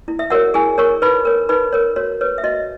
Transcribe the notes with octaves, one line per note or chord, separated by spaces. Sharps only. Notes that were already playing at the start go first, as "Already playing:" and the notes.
E4
E5
F#4 A#4 C#5 F#5
E4 G#4 G#5
A#4 C#5 C#6
D#4 B4 B5
A#4 C#5
D#4 B4 B5
A#4 C#5
F#4 C#5
B4 C#5
E5
F#4 D#5